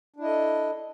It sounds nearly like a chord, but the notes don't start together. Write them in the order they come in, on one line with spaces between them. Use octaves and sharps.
D4 E4 D#5 A4